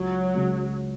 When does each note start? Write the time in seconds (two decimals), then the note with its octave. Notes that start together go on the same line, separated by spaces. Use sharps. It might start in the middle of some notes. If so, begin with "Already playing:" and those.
Already playing: C#2 F#3
0.35 C#3 G#3